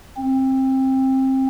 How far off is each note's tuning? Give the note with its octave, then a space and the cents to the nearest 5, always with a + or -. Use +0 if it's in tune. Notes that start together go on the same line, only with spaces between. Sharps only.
C4 +20